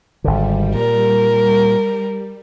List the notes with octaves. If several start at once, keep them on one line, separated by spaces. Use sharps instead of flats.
G#1 D3 G3
A#2 A#4